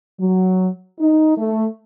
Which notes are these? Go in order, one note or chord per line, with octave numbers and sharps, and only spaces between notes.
F#3
D#4
A3